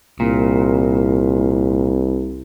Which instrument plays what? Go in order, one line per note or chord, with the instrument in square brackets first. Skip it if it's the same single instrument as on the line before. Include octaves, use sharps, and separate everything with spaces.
[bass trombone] C2 [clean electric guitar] A#2